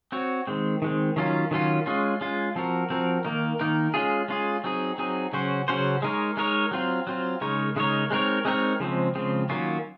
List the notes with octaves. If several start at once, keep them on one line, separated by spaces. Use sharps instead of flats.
C4 F#4 C#5
D#3 G#3 C4
D#3 G#3 C4
D#3 F#3 C#4 F4
D#3 F#3 C#4 F4
G#3 C#4 F4
G#3 C#4 F4
F3 C4 F#4 A#4
F3 C4 F#4 A#4
D#3 A#3 D#4 A#4
D#3 A#3 D#4 A#4
G#3 C#4 F4 G#4
G#3 C#4 F4 G#4
F#3 C4 D#4 G#4
F#3 C4 D#4 G#4
C#3 F#3 C#4 F#4 C5
C#3 F#3 C#4 F#4 C5
G#3 D#4 A#4 C#5
G#3 D#4 A#4 C#5
F#3 C4 F4
F#3 C4 F4
C#3 G#3 D#4 A#4 C#5
C#3 G#3 D#4 A#4 C#5
G#3 C4 D#4 A#4 C#5
G#3 C4 D#4 A#4 C#5
C#3 F3 G#3 C4
C#3 F3 G#3 C4
D#3 F#3 A#3 C#4 F4